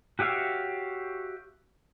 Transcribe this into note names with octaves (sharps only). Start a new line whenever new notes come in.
F#4 G4 C#5 E5 F5